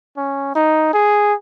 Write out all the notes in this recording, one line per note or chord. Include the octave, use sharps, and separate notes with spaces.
C#4
D#4
G#4